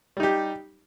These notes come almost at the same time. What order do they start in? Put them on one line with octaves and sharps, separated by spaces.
G3 D#4 G4